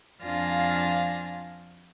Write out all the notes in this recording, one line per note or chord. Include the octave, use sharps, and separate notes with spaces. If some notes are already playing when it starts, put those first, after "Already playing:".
F2 D4 F4 F5 G#5 A#6